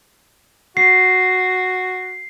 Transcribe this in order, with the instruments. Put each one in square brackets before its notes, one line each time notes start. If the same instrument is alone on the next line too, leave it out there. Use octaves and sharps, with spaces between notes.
[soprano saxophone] F#4 [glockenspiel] C7